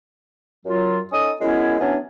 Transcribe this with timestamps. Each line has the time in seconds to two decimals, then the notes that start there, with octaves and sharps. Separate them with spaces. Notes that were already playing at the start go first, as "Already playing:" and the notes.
0.66 F#2 F#3 F4
1.12 C#4 D#4 A4 D#6
1.41 F#2 G#3 B3 C#4 E4
1.80 E3 F#3 B3 C#4 D4